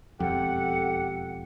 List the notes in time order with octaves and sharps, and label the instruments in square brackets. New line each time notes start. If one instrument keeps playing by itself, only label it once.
[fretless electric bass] E1 F2 [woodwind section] G4 A4 F#5